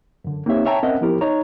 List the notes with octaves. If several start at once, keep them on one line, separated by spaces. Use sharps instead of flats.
F#2 D3
A#3 C4 D#4 G4 C#5 E5
C#5 E5 G5 A5 A#5
C4 C#4 A#4 D#5 E5 F#5
F3 B3 E4 G4 A#4
D#4 C#5 D#5 A#5